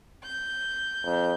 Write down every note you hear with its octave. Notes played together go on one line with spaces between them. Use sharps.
G6
F2